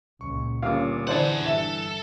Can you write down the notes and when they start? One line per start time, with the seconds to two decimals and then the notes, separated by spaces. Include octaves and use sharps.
0.21 C#2 A#2 C#6
0.62 G1 G2 A#2 C#4 F5 D6
1.07 D3 E3 D4 G#4 C5 D5 F#5 A5
1.46 G1 A4 E5